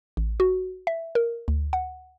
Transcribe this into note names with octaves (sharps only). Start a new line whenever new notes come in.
A1
F#4
E5
A#4
D2
F#5